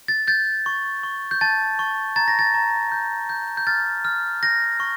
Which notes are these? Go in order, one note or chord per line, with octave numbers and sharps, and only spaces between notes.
A6
G6 A6
C#6
C#6
G6
A5 A6
C#6
A#5 A6
A#6
A6
A#5
G6
G6
G6
F6 A6
F6
G6 A#6
C#6